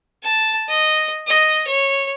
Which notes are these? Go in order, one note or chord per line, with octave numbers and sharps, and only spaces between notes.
A5
D#5
D#5
C#5